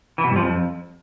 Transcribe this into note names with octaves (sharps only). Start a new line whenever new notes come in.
E3
B2
G2
F3
F2